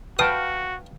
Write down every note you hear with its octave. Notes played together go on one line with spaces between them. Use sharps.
F#4 B4 F5 G5 A5 D#6